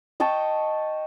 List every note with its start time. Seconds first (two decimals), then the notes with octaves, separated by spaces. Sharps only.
0.20 D#5 G5 A5 C#6